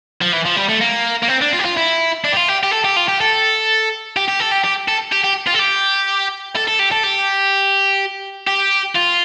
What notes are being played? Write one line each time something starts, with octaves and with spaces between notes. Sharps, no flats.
F3
E3
F3
G3
A3
A#3
A#3
C4
D4
F4
G4
F4
E4
D4
G4
F4
G4
G4
A4
G4
F4
G4
A4
G4
G4
A4
G4
G4
A4
G4
G4
F4
A4
G4
A4
A4
G4
A4
G4
G4
F4